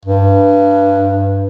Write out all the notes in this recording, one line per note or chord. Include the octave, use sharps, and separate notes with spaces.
G2